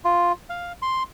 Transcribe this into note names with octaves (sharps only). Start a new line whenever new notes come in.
F4
F5
C6